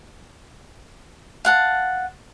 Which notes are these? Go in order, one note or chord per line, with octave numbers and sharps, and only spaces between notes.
F5 F#5 A5